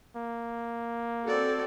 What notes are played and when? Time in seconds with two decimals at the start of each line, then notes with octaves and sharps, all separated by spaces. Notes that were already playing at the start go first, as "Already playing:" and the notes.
0.16 A#3
1.25 C4 F#4 A4 D5